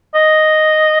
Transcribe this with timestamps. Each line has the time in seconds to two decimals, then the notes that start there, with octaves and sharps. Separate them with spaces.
0.15 D#5